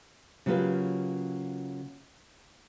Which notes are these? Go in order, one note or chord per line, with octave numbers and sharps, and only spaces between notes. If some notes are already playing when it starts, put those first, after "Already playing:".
C#3 F#3 A#3 F4 G4 B4